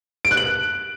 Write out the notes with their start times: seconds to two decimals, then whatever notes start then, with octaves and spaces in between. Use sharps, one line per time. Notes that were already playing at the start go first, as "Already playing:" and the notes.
0.25 D7
0.31 F#6
0.37 F#7